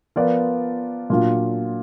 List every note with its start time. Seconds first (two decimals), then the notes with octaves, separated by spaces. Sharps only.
0.16 F3 B3 F4 A#4 D5
1.10 A#2 F#3 D4 F4